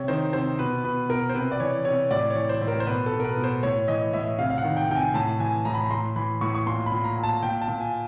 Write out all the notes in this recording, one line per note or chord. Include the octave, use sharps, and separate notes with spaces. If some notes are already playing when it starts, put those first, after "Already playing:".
Already playing: C3 C#5
D#3 C5
C3 C5
B2 B4
B2 B4
B2 A#4
C5
C3 B4
D5
E3 C#5
C3 C#5
A2 D5
C#5
E3
C5
A2
A#4
C5
B2 B4
A4
B2
A#4
B4
B2
C5
A2 C#5
E3 D#5
A2 E5
C3 F5
F5
F#5
D#3
G5
C3 G5
G#5
A2 A5
E3 G#5
A2 A#5
B5
A#5
A2 C6
E3 B5
A2 C#6
C#6
A#2 C6
B5
A#2
A#5
A#2
A5
A#2 G5
A5
A#2
G#5